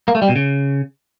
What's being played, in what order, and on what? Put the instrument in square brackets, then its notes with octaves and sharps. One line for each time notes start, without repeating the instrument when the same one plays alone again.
[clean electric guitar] A#3
A3
G3
B2
C#3